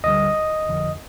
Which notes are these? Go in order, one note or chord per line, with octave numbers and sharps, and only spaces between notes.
D2 D3 G3 D#5
G1 F2 D3 F3